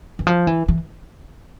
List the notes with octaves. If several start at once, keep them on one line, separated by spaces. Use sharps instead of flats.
E3
F3
E3
E3